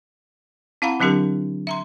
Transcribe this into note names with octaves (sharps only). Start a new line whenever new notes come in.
C4 E4 F5 F#5 A#5 B5
D3 F#3 C4 D4 G4 A#4
E5 A#5 C6